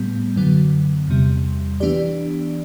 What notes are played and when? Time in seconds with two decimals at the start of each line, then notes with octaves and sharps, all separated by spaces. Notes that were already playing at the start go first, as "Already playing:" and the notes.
Already playing: A2 G3 B3
0.36 F#2 D3 F#3 B3
1.08 E2 C3 G3
1.80 E3 B3 D4 G4 D5